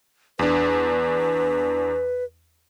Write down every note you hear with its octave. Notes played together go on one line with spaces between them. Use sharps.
E2 D4 B4